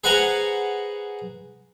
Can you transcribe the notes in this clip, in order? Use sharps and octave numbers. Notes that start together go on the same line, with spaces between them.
G#4 B4 C5 F#5 G#5 A#5